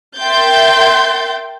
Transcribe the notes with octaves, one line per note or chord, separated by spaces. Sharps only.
A#4 E5 G5 C6 G6 A6